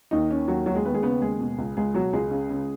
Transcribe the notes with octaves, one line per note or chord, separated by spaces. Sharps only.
D#2 D#3 D#4
D#3 C#4
D#2 F#3 F#4
D#2 F#3 F#4
G#3 G#4
D#2 B3 B4
G#3 G#4
C#3 B3 B4
D#2 G#3 G#4
B2
C#2
C#2 G#3 G#4
B2 F#3 F#4
C#2 G#3 G#4
C#3
C#3